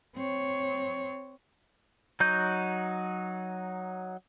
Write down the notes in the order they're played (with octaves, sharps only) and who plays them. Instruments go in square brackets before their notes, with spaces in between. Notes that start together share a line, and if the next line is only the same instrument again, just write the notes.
[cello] C4 C#5
[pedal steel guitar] F#3 D#4 F#4 G6